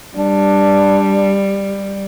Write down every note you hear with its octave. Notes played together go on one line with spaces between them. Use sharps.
G3 D4